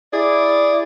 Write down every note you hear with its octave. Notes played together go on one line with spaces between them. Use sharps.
E4 G#4 D5